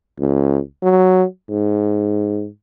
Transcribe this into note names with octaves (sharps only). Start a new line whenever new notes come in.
C#2
F#3
G#2